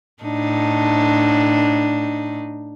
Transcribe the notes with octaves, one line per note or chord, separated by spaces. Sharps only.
A2 D4 D#4